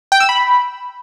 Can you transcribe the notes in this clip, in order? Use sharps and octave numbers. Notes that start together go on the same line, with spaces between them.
G5
E6
B5